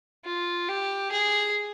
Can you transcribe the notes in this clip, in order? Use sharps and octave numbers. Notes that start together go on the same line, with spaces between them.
F4
G4
G#4